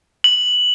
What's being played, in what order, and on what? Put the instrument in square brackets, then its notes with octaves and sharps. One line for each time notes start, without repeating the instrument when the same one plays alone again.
[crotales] F#7